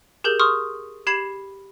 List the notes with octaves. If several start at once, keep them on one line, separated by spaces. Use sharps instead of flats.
G4 G#4 A#4 G6 F#7
C6 C#6 D#6 F6
G4 B5 G#6 C7 E7